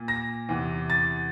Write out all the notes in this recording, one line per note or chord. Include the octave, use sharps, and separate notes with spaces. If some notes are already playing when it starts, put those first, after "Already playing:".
Already playing: A#2
A#6
E2 C3 E3
A6